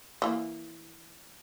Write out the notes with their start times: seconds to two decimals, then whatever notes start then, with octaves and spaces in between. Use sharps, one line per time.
0.22 E3 A#3